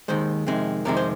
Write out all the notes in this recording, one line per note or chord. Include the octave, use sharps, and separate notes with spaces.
D#2 D#3 G#3 C5
F2 C3 D#3 G#3
F2 C3 D#3 G#3 A#4
C5